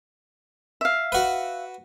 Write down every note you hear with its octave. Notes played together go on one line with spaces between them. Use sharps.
E5 F5
F#4 B4